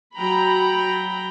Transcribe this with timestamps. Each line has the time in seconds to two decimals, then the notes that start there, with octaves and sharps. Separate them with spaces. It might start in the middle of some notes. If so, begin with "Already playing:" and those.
0.15 F#3 G5 A#5 B5